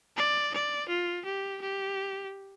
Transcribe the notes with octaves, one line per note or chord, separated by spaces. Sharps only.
D5
D5
F4
G4
G4